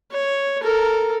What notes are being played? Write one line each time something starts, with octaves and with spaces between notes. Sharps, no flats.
C#5
A4 A#4